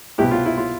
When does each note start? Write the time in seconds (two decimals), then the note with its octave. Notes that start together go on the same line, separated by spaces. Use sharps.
0.18 C2 B2 B3 E4 G4
0.31 F4
0.46 E4
0.58 F4